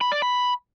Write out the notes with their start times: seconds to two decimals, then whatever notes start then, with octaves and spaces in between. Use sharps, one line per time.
0.01 B5
0.12 D5
0.22 B5